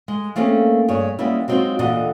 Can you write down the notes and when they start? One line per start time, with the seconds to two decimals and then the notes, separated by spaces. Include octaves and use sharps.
0.08 G#3
0.36 A3 A#3 C4 C#4 G#4 F5
0.88 G2 G#4 C#5
1.19 G3 G#3 A#3 B3 C#4 E4
1.48 F#3 G#3 C4 D#4 F4 F#4
1.79 D#2 A#2 D3 E3 D#5 F#5